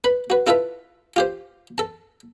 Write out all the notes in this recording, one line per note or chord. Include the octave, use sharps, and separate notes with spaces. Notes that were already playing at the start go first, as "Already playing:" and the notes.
B4 B5
F#4 B4
E4 F4 A4 B4 E5
F4 G4 C5
A4 A5